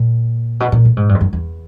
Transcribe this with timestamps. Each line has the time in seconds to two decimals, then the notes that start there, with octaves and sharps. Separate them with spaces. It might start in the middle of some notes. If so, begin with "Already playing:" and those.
Already playing: A#2
0.60 B2
0.72 A#2
0.85 A2
0.97 G#2
1.09 G2
1.15 F2
1.21 F#2
1.33 E2